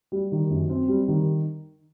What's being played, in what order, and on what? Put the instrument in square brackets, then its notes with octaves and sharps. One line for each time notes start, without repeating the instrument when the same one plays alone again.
[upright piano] G3
D#3
F#2
C4
G3
D#3